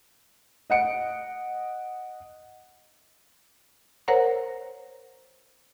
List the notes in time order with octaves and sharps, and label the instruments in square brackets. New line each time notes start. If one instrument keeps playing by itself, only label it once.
[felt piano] D#5 F#5 C#7 D7
[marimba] A#4 C5 C#5 F#5 A#5